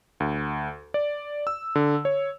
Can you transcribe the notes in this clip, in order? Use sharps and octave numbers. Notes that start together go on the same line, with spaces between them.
D2
D5
E6
D3
C#5